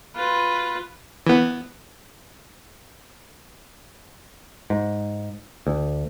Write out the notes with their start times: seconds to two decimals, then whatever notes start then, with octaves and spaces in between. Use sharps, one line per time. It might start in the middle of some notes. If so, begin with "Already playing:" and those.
0.16 F4 B4
1.27 E3 B3
4.70 G#2
5.67 D2